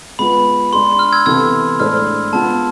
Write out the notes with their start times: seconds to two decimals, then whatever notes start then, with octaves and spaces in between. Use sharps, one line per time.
0.19 G#3 B3 F4 B4 B5
0.73 G#3 D4 G#4 C6
0.99 F6
1.12 E6 G#6
1.26 C3 E3 B3 E4 A4 E6 G#6
1.80 A2 G#3 D4 A4 C5 F6
2.33 G#3 B3 F4 B4 A5